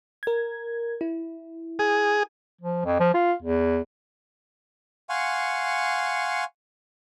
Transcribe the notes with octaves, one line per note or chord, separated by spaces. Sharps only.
A#4 G#6
E4
G#4
F3
F2
F3
F4
E2
F5 F#5 G#5 C6 C#6